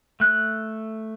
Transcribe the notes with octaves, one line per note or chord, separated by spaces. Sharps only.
A3 F#6